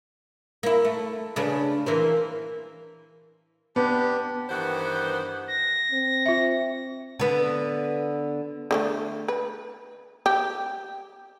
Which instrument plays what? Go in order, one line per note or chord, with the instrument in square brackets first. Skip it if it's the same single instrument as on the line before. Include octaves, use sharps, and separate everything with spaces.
[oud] A#3 E4
A3
C#3 D4 B4
E3 A#3 C5
[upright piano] B3 [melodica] D4 G4
[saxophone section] G2 D#3 E3 B3 C5 F#5
[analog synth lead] A#6
[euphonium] C4
[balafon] F4 E5
[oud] D3 B3 B4
[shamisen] D3 F#3 A3
B4
G4